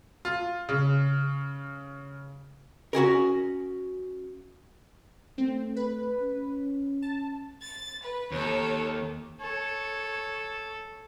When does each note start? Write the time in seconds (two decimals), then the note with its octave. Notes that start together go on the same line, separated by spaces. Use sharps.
0.25 F4
0.69 C#3
2.93 C#4 F#4 G#4 A#4
5.38 A3 C4
5.76 B4
6.21 C#4
7.02 A5
7.62 A6
8.02 B4
8.31 D#2 A4 C#5
9.41 A4 C#5